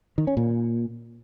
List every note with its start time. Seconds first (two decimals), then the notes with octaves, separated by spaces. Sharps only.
0.18 D#3
0.27 C#4
0.37 A#2